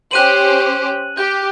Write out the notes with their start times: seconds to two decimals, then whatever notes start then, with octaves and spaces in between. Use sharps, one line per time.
0.11 C#4 G4 C5 F#6 D#7 F#7
1.17 G4 G6